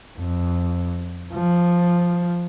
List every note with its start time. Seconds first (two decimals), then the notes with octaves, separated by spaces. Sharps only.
0.18 F2
1.33 F3